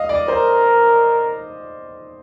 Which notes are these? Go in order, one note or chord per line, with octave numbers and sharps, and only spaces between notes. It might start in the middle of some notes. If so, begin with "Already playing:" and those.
Already playing: D#5 F5
D5
A#4 C5